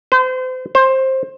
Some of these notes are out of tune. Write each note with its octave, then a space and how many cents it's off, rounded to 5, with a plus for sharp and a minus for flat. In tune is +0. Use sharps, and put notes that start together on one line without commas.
C5 -35
C5 +15